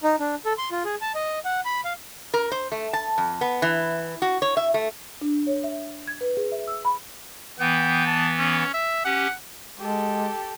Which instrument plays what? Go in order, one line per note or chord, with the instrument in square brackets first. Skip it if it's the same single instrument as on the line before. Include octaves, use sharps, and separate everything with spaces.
[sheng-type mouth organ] D#4
D4
A4
C6
F4
G#4
A5
D#5
F#5
B5
F5
[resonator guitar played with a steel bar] A#4
C5
A3
A5
F2
B3
E3
F#4
C#5
E5
A3
[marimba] D4
C#5
E5
G#6
B4
G#4
E5
E6
B5
[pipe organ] E3 B3 [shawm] G5
[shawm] A5
C#4
E5
[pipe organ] C#4 G4 [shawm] F#5
[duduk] G#3 [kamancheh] G4 A4